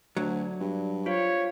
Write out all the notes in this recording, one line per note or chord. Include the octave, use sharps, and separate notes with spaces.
D2 F#3 D5
G2
F4 C5 C#5 F5